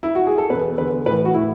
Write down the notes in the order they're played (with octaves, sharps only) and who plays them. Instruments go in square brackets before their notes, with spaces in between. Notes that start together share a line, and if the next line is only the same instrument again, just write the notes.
[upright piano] E4
F#4
G#4
A4
E2 B2 B4
E2 D3 B4
A2 B4
E3
F#4
A2 E3 E4